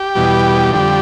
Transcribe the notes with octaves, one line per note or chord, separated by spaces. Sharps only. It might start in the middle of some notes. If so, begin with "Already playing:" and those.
Already playing: G4
E2 B2 G3
F2 D3 G3